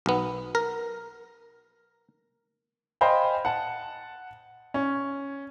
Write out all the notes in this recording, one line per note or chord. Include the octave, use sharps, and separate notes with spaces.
B1 B3
A#4
C5 D#5 F5 G5 G#5 B5
F#5 A5
C#4